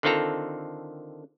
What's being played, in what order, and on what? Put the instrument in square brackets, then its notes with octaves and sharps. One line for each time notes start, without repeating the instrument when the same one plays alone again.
[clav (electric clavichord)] D3 D#3 C4 F4 A4 A#5